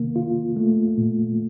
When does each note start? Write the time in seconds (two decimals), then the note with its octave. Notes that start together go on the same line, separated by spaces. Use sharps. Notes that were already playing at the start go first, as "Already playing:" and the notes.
Already playing: C3 D#3 A#3
0.16 F4
0.56 A3
0.98 A#2